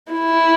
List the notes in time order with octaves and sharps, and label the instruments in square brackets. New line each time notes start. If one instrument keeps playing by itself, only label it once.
[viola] E4